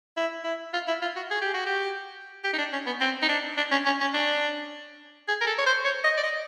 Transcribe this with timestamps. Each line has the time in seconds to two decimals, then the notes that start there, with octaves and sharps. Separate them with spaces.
0.16 E4
0.44 E4
0.73 F4
0.87 E4
1.02 F4
1.16 F#4
1.30 G#4
1.41 G4
1.53 F#4
1.66 G4
2.44 G4
2.53 D#4
2.58 D4
2.73 C#4
2.86 B3
3.00 C4
3.22 D#4
3.28 D4
3.57 D4
3.71 C#4
3.86 C#4
4.00 C#4
4.13 D4
5.28 G#4
5.41 A#4
5.46 A4
5.58 C#5
5.66 C5
5.84 C#5
6.04 D#5
6.17 D5
6.23 D#5